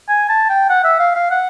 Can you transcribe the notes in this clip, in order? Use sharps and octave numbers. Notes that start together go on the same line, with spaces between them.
G#5
A5
G5
F#5
E5
F5
F5
F#5